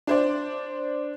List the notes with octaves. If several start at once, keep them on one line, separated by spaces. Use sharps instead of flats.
D4 C5 D5